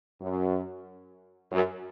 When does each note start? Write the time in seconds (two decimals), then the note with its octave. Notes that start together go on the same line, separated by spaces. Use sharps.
0.21 F#2
1.52 F#2